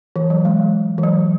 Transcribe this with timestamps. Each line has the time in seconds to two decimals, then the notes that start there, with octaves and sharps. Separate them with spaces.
0.16 E3
0.30 F#3
0.45 G#3
0.98 E3
1.03 F#3